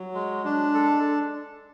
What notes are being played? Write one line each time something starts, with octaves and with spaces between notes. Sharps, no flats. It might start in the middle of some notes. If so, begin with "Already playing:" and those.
Already playing: F#3
G#3
D4
A4